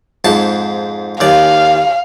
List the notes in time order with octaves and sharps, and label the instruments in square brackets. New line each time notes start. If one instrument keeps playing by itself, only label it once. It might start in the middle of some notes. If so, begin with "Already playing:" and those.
[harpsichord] F2 G#2 A5
[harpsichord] D#2 D5 [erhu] F5